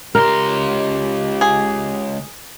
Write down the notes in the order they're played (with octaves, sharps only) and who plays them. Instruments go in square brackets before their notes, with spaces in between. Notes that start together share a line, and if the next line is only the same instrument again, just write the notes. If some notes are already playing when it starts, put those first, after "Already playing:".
[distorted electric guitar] C#2 C6 [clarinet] G4 [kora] A#4
[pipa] G#4